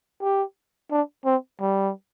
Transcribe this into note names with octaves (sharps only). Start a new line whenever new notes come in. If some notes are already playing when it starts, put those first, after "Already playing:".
G4
D4
C4
G3